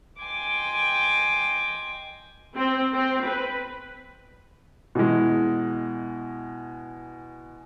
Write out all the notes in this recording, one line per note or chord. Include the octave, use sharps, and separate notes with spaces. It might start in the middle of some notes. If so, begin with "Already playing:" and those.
D#5 G5 G#5 C6 D6
C4
C4
B4
B2 E3 G#3